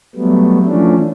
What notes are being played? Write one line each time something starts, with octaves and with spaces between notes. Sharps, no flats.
F#3 G3 A3 B3
E3 F3 A3 C#4 D4